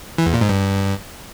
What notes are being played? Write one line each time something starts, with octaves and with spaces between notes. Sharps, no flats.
E3
E2
A#2
G#2
G2